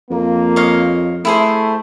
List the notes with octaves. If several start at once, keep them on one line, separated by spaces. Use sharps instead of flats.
F2 A#3
C#5 D#5 F5
A3 E4 G#4 C5